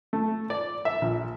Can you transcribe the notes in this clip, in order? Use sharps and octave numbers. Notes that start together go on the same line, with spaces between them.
A3
D5
E5
A#1